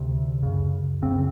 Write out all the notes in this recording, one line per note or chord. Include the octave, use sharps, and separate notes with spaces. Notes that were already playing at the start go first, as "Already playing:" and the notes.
Already playing: D2 C3
F#2 C#3
F#2 C#3 C4